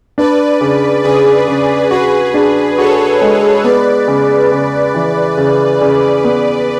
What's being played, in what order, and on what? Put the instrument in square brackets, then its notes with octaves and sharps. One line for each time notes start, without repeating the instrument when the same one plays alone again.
[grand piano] D4 [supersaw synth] B4 D5
[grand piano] C#3
[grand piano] C#3 [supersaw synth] G#4 B4
[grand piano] C#3
[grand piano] F#4 [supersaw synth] G#4 B4
[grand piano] D4
[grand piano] F#4 [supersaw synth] A4 C#5
[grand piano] G#3
[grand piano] B3 [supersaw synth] B4 D5
[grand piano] C#3
C#3
E3
C#3
C#3
B3